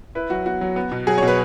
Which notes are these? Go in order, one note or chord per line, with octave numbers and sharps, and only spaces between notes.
E4 B4
F#3 F#4
B3 F#4
F#3
B3
B2
F#3 G#4
C#5
B2
B4